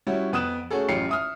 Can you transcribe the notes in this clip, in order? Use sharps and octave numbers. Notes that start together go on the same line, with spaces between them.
G3 C#4 E4 F#4
F2 B3 D#6 F#6 E7
A3 C#4 F#4 G#4 A4
A1 F#2 F4 G4 C7 C#7
E5 D#6 F6